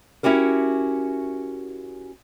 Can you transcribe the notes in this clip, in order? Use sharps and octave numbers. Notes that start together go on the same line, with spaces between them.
C#4 E4 F#4 G4 A#4